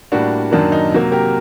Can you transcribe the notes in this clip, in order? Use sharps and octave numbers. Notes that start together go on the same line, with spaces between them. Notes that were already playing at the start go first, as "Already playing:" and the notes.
A2 G3 A#3 D4 F#4
F#2 D#3 F#3 A#3 D4
D#4
C3 F#3 A#3
G4 A#4